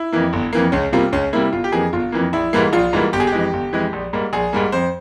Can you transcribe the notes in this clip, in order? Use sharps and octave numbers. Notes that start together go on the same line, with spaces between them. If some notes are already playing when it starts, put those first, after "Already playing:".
Already playing: E4
F2 E3 A#3
G1
F2 E3 A#3
C#2 C#4
C3 G3 A#3 F4
C#2 C#4
C3 G3 A#3 E4
G1 F4
G4
F2 E3 A#3 G#4
G1 F4
F2 E3 A#3
A#1 E4
G#2 E3 G3 A#3
A#1 F4
G#2 E3 G3 A#3
G1 G4
G#4
G4
F2 E3 G#3
G1
F2 E3 G#3
A#1
G#2 G3 A#3
A#1 G#4
G#2 G3 A#3
F2 C5